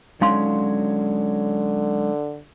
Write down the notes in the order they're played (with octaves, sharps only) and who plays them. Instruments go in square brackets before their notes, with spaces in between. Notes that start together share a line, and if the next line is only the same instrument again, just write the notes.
[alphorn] D3 [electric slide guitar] F#3 G#3 C#4 [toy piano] D#4 F5 C6